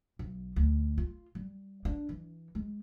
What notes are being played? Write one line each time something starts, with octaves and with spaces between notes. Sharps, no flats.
B1
D2
F4
G3
D4
E3
G#3